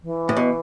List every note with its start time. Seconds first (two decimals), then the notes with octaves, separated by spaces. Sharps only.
0.03 E3
0.29 A2
0.37 B2